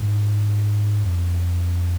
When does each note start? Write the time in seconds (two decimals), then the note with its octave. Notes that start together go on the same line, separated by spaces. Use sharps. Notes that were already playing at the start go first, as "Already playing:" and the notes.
Already playing: G#2
1.03 F2